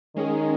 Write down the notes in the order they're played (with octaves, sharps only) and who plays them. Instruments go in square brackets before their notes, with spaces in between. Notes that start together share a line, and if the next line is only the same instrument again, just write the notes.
[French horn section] D#3 [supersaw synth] G#3 C#4 G#4